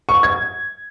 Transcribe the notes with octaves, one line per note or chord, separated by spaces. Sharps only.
C#6
G#6